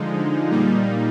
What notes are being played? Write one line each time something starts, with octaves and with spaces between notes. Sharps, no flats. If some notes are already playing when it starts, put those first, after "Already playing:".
Already playing: D3 F3 G#3 D#4
A#2 G3 A#3 D#4